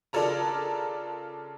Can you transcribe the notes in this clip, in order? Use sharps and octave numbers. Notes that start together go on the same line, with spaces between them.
C#3 D4 F4 A4 A#4 A#5